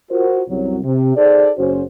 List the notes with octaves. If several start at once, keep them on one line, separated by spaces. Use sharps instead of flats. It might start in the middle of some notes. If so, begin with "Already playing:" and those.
F4 F#4 A#4 C5
C2 F#2 F#3
C3
D#4 G#4 A4 C5 D5
F#1 C#4 F#4 C5